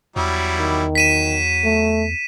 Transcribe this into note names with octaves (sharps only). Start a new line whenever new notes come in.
E2 F#3 G3 E4
D#3
F#3 B6 D#7 E7
A3